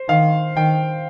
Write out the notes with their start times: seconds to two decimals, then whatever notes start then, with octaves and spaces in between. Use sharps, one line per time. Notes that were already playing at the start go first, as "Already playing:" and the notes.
Already playing: C5
0.09 D#3 F5
0.56 D#3 G5